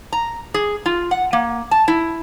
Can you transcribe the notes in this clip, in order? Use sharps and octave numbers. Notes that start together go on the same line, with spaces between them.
A#5
G#4
F4
F#5
A#3
A5
E4